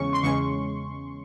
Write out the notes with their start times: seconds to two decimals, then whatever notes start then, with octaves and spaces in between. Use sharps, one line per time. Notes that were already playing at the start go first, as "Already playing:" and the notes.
Already playing: E2 C#3 G#3 C#4 C#6
0.13 C6
0.23 E2 C#3 G#3 C#4 C#6